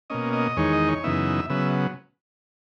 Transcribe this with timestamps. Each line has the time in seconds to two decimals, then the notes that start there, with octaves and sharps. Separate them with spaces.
0.10 B2 A#3 C#4 D#5
0.33 D#5
0.57 E2 D#3 G#3 D#4 C#5
0.73 D#5
0.88 C#5
1.04 F#2 C#3 E3 B3 D#4 E5
1.50 C#3 F#3 B3 E5